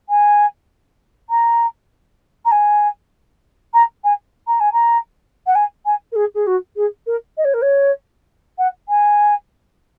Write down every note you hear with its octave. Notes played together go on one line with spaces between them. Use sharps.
G#5
A#5
A#5
G#5
A#5
G#5
A#5
G#5
A#5
F#5
G#5
G#5
A#4
G#4
G#4
F#4
G#4
A#4
D#5
C#5
A#4
C#5
F#5
G#5